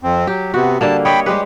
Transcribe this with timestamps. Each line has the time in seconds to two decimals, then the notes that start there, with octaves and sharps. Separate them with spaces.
0.03 F2 C4
0.27 F#3 G4
0.54 C3 B3 F#4
0.81 D3 G3 A#3 A5
1.05 C#5 D#5 G5 B5
1.26 G3 G#3 G4 B4